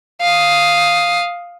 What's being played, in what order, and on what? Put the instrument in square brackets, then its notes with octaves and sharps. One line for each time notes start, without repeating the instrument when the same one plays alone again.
[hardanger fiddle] F5 D#6